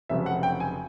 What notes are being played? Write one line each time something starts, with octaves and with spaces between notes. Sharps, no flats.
F1 F2 C#3 F#3 E5
F#5
G5
G#5